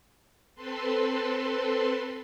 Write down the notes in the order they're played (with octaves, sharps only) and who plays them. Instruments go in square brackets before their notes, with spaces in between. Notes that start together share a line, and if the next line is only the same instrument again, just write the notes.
[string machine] C4 A4 B4 C6